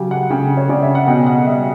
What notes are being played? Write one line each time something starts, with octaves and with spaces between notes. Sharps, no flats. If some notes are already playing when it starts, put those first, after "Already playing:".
Already playing: C#3 F#3 G4
F#5
C#3 G5
C#5
C#3 D5
E5
F#5
B2 G5
F#5
G3 E5